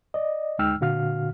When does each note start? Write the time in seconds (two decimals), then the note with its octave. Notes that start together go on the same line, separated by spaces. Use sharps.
0.14 D5 D#5
0.59 D2 G#3 D#4 G5 E6 F6
0.81 A#2 D3 F#4 F5 F6